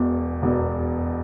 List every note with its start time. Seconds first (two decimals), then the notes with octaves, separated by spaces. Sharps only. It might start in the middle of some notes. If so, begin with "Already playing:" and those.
Already playing: E1 E2 B2
0.42 E1 E2 B2